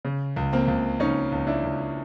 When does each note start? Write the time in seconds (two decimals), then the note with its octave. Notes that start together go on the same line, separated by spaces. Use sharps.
0.05 C#3
0.36 C#2
0.53 A#3 C4
0.68 C#2
1.00 C#2 C#4 D#4
1.32 C#2
1.47 D4 E4
1.63 C#2